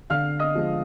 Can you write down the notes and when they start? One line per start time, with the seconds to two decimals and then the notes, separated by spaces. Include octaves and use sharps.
0.10 D3 F5 F6
0.39 D#5 D#6
0.55 F3 G#3